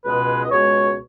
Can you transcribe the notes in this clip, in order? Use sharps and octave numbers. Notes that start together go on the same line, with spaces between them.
C#2 B2 G#3 B4
D#5
C#2 B2 G#3 C#5